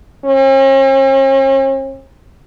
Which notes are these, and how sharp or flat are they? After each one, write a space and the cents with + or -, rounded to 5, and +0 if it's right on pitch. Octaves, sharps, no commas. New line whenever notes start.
C#4 -45